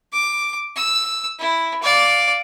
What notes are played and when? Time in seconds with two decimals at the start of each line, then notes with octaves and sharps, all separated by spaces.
0.13 D6
0.76 E6
1.39 E4
1.83 D5 F5